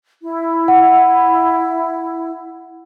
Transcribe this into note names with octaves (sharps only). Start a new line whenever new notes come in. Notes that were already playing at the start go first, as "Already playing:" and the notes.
E4
F#5